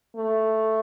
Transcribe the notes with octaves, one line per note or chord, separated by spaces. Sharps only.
A3